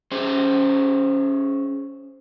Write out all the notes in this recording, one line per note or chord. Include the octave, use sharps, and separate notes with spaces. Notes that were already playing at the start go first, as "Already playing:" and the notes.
C#4 G#4 C5